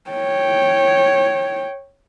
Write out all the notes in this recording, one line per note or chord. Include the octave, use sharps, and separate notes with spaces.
C#5 G5